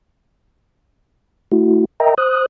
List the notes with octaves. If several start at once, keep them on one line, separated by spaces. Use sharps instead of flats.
A3 E4 F#4
A#4 D#5 E5 G5 A#5
C5 D#6 F#6